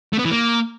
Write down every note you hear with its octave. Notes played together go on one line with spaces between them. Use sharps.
A3
B3
E3
A#3